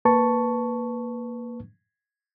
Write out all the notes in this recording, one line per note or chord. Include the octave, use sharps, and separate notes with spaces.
A#3 B4 A5 C#6